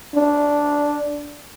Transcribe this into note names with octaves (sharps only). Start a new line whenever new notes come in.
D4